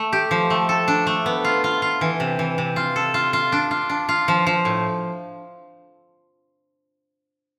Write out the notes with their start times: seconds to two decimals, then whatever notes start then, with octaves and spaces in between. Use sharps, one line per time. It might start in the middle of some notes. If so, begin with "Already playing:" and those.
Already playing: A3
0.13 G4
0.31 F3
0.50 A3
0.69 A4
0.88 D4
1.07 A3
1.26 B3
1.45 F4
1.64 F4
1.82 F4
2.01 E3
2.20 C3
2.39 E3
2.58 C3
2.76 F4
2.96 A4
3.14 F4
3.33 F4
3.52 D4
3.71 F4
3.89 D4
4.09 F4
4.28 F3
4.47 F3
4.65 A2